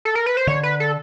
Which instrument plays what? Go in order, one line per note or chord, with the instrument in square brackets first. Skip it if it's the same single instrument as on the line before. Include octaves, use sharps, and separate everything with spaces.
[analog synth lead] A4
A#4
B4
C5
[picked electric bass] D3 [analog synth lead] C#5
[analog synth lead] B4
A4